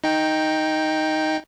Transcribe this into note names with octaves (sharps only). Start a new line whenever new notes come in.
D#4 G5